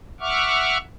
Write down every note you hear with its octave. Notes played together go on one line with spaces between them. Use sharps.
E5 F#5 C#6 D6 F6